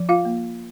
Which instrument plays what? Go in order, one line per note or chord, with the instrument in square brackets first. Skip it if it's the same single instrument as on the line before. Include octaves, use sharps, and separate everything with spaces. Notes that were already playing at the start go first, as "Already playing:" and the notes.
Already playing: [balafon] F3
F4 F5
A#3